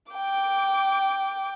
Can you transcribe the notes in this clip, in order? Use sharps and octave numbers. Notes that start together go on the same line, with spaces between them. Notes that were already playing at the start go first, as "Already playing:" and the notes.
G5 D6